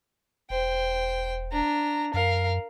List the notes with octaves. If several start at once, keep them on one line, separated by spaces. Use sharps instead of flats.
E1 C5 G5
D4 A#5
F#2 A#4 F5